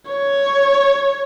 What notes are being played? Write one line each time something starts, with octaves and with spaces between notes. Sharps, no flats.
C#5